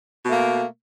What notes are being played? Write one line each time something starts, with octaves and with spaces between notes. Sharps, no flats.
B2 A3 A#3